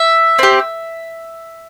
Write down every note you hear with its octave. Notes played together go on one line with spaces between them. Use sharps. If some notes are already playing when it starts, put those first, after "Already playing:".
Already playing: E5
C4 G4